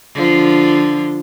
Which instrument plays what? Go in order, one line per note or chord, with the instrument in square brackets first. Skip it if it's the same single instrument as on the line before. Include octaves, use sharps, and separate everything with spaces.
[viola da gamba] D3 F3 F4